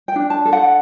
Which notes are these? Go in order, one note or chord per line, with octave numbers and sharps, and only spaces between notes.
G5
D4
A5
A4
F#5